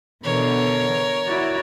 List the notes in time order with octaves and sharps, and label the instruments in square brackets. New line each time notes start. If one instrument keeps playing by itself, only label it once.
[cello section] B2 D3 E3 [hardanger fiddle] A#4 C#5
[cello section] E4 F#4 D5